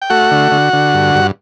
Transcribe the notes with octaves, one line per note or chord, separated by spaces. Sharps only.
G5
A3 F#4 F#5
D3
D3
D3
G2
G2